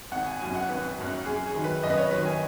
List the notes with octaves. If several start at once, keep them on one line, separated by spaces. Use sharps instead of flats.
G#1 F#5
G#5
F#2 F#3 G#5
F#5
G#1 B4
F#2 F#3
F#2 G#4
G#4
D#3 F#3
B4
F#2 D#5
B4
C#5
D#3 F#3 B4
G#5